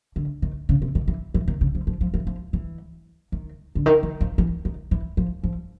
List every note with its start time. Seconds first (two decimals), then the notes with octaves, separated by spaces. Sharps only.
0.16 D3
0.42 D#3
0.69 C#3
0.82 C3
0.95 D#3
1.08 E3
1.34 E3
1.48 D#3
1.61 C#3
1.75 F3
1.87 F3
2.01 F3
2.14 E3
2.27 F3
2.53 E3
3.32 D#3
3.75 D3
3.86 D#3
4.03 E3
4.21 F3
4.38 E3
4.65 D#3
4.91 E3
5.17 F3
5.43 F3